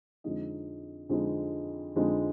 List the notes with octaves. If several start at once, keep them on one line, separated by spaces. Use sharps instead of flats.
F2 D3 G#3 D#4 D#5
F2 D3 G#3 D#4
F2 D3 G#3 D#4